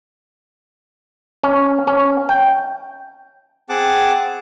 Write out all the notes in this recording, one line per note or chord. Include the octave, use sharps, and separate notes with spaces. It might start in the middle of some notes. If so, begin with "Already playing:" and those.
C#4
C#4
G5
C4 G#4 F#5 A5 D6